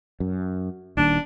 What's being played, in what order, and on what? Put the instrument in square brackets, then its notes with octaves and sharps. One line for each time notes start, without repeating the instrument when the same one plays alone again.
[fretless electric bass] F#2
[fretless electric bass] D#1 D#2 [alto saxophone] D4